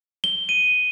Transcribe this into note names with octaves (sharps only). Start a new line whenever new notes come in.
G7
D#7